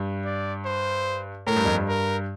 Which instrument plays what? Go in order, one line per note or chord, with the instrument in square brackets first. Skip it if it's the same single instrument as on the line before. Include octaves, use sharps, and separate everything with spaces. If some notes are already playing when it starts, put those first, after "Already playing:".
Already playing: [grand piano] G2
[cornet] D5
C5
[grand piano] A2 [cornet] A#4
[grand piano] G2
F2
G2
[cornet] A#4